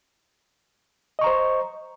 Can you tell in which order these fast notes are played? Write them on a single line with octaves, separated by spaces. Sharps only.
D#5 C#6 A#5 C5